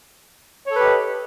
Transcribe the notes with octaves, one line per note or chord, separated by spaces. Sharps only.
G4 A4 B4 C#5 D#5